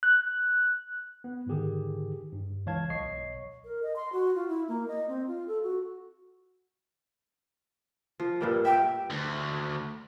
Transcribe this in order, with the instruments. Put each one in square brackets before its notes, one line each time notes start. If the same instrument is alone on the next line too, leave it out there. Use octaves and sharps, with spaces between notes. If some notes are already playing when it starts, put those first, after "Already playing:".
[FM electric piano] F#6
[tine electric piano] B3
G#2 D3 D#3 G4 G#4
G2
C#2 E3 C#5 F5 A5 G#6
B1 C#5 D#5 C#6 C7
[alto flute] A#4
D#5
C6
F#4
F4
E4
A#3
D#5
C4
F4
A4
F#4
[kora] F3
G2 A#2 G3
[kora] E5 [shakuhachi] G5
[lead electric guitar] D2